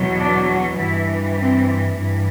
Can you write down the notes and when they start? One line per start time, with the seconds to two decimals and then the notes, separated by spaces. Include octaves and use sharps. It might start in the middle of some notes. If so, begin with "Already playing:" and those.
Already playing: E2 B2 F#3
0.18 D4
0.48 F#4
0.77 G2 E3 E4
1.35 C4
1.93 G2 E3